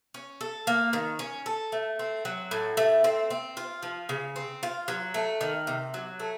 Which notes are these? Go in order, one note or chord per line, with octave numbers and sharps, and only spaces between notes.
C#4
A4
A#3
D#3
C#4
A4
A3
C4
F#3
A2
A3
C4
C4
F4
F3
C#3
C4
F4
F#3
A3
D#3
C3
F#3
A3